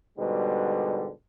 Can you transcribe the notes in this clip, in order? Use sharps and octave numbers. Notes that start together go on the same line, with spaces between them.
G#2 B2 D3 G3